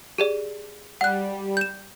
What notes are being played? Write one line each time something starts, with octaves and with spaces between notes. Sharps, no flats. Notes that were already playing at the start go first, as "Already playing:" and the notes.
G4 G#4 D5
G3 F#5 F#6
G6 E7